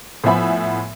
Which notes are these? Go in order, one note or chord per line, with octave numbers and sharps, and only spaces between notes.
A2 F3 B3 E5 G#5 B5